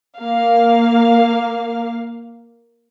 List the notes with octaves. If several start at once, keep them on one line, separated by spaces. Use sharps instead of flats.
A#3 F5